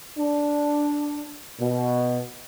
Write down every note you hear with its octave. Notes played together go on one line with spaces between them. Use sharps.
D4
B2